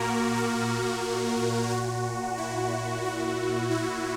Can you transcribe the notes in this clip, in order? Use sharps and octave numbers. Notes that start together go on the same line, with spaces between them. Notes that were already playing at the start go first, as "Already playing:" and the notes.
Already playing: A#2 A#3 F#4 A#4
A#4
A#2 F#4
E4
F#4
E4